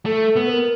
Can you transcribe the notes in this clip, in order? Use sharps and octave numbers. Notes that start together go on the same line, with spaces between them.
A3 A4
B3
B4
A#4